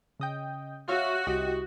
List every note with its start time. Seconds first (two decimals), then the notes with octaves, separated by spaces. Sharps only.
0.20 C#3 D#5 G5
0.88 F#4 C#5 E5 F5
1.27 C2 G4 D#5